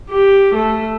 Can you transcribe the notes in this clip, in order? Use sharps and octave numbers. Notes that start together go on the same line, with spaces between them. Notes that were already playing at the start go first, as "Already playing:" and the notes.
G4
A3